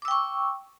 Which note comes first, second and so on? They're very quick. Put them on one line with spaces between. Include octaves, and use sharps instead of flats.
D6 E6 G5 C#6